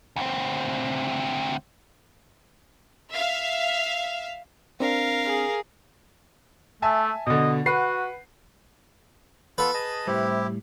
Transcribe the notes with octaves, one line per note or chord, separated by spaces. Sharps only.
D2 C4
E5 F5
C4 D4 A#4 F5
G#4
A3 E5 G#5 A5
B2 D3 D#5
F#4 B4 F#5 C7
B3 F4 A4 B4
G#4 D#5 A5
A2 C3 G3 E4 G4